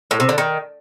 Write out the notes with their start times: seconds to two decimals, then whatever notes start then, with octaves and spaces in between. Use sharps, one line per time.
0.11 A2
0.20 C3
0.29 D3
0.38 D#3